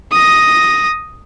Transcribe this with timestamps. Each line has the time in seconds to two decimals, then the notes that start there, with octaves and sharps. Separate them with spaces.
0.12 D#6 A#6